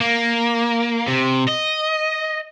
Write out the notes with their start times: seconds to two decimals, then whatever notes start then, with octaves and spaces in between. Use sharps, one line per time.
0.01 A#3
1.08 C3
1.49 D#5